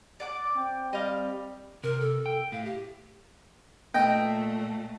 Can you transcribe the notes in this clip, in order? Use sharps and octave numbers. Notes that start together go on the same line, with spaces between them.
D5 F#5 D6
C4 G5
G3 D#5 F5
C3 A#4
A4
G5
A2 F5
G4
A#2 A3 D#5 G5